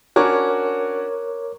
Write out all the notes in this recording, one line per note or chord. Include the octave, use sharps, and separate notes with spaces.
C#4 D4 F#4 A#4 C#5 D6